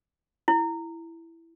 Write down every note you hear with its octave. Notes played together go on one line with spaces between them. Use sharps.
E4